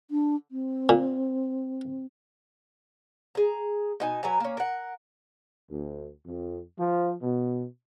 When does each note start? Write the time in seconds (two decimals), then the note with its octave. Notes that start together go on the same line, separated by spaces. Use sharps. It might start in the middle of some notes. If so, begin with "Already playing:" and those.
0.11 D4
0.51 C4
0.89 A#2
3.35 G#4 A#5
4.00 B2 D#4 G#5
4.23 F#3 B4 G#5 A#5
4.40 A#3 C#4
4.57 A#4 F#5
5.68 D2
6.24 F2
6.77 F3
7.21 B2